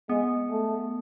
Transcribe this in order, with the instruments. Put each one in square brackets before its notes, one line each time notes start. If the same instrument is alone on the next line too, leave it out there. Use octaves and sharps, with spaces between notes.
[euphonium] G#3 [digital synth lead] B3
[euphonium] A3